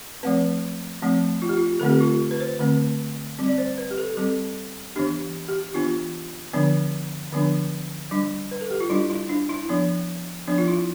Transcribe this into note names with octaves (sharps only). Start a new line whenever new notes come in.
F3 A3 C4 B4
F3 A3 C4
F4
G4
F4
D3 A3 C4 A4
G4
F4
B4
C5
D3 A3 C4
G3 C4
D5
C5
B4
G4
A4
G3 C4 A4
E3 B3 D4 G4
G4
E3 B3 D4 F4
D3 F3 B3 D4
D3 F3 B3 D4
G3 D4
B4
A4
G4
F4
G3 D4 E4
E4
D4
E4
F3 B3 D4
F3 B3 D4
F4
E4